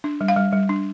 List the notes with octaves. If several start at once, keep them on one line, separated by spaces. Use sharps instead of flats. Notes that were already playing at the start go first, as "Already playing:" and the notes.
D4
G3
F5
G3
G3
D4